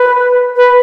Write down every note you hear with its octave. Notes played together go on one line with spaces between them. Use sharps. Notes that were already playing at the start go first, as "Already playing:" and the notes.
Already playing: B4
B4